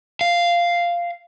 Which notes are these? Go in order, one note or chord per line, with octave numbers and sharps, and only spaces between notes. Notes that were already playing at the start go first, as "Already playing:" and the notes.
F5